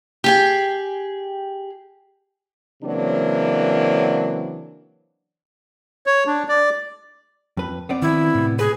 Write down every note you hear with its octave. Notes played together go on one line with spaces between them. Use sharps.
G4 G#4 G5
C#3 E3 F#3 A#3 C4 D4
C#5
D4
D5
F2 B4
B3 C4 D5
D#3 F3 E4
A2 C3
G#4 B4